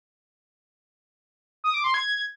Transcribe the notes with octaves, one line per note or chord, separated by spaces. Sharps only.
D#6
D6
C6
G#6